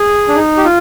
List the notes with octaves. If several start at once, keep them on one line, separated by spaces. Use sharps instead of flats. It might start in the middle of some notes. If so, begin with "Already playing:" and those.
Already playing: G#4
D4
D#4
G4
F4